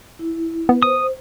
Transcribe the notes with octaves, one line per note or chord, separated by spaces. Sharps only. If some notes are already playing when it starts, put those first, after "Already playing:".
E4
B3 B4
C5 D#6